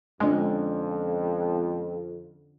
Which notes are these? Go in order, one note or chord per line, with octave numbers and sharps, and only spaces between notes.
F2 D3 G#3 C#4